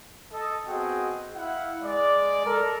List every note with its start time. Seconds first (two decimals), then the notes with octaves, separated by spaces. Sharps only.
0.33 A4 D#5
0.68 B3 C4 F#4 G#4 D#5 G5
1.36 E4 F5 F#5
1.83 G#3 D5
2.46 A4 A#4